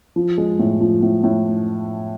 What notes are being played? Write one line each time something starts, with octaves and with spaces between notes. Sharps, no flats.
F3
G#3
A2
F3
A2
A2